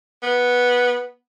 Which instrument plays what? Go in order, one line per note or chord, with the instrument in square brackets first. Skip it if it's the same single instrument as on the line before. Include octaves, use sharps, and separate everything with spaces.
[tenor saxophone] B3